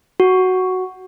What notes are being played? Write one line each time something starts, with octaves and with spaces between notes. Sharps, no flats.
F#4